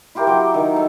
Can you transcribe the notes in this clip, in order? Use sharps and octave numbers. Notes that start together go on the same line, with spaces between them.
E4 F4 G4 A#4
F#3 G5 D6
D#3
A4 F5